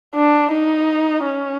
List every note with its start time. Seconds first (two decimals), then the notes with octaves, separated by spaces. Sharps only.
0.15 D4
0.52 D#4
1.25 C#4